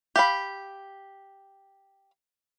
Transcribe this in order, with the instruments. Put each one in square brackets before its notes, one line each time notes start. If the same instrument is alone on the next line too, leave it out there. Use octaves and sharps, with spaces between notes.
[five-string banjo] G4 F5 B5